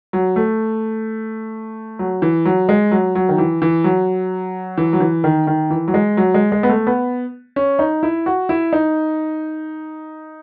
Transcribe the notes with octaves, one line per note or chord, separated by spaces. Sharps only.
F#3
A3
F#3
E3
F#3
G#3
F#3
F#3
D#3
E3
E3
F#3
E3
F#3
E3
D#3
D#3
E3
F#3
G#3
F#3
G#3
G#3
B3
A3
B3
C#4
D#4
E4
F#4
E4
D#4